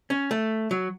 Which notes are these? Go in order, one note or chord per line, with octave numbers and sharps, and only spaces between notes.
C#4
A3
F#3